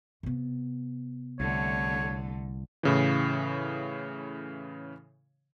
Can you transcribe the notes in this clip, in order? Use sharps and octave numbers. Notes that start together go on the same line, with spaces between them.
C3 B3
C2 D3 A3 C#5
A2 C#3 E3